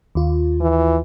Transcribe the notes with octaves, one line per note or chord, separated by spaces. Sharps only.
D#2 F4
E3